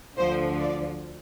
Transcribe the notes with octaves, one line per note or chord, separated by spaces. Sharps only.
D2 D3 F3 C5
D5